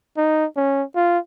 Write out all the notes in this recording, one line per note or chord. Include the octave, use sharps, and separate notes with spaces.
D#4
C#4
F4